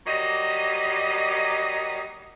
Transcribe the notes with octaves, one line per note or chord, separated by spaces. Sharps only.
F#3 G3 A#3 D#5